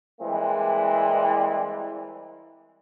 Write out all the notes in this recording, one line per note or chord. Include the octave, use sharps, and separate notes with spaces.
E3 G3 G#3 A#3 C4